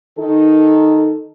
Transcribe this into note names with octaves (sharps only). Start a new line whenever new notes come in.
D#3 D#4 A4